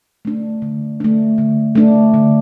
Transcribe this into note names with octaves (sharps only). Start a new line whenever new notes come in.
A3 D4
D3
A3 D4
D3
A3 D4
D3